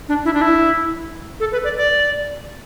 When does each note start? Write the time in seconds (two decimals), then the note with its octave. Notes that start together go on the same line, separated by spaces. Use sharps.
0.09 D4
0.25 E4
0.33 D4
0.42 E4
1.40 A4
1.52 B4
1.64 D5
1.77 D5